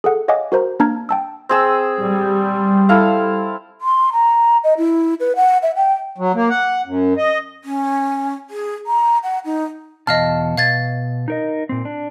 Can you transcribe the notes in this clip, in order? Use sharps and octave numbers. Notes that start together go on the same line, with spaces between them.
G#4 A4 F#5
C#5 D#5 F5 F#5 G#5 D6
F#4 A#4 C5 A#5
A#3 D4 A5 A#5 F6 G#6
G5 A5 E6
C4 G#4 E6
G3
E4 A4 F5
C6
A#5
D#5
E4
B4
F#5
E5
G5
F#3
A#3
F#5
F#2
D#5
C#4
G#4
A#5
F#5
D#4
E2 B2 D#5 F5 A5 F6
B2 F5 G#6 A6
D#4 A#4 D#5
A#2 C4
D4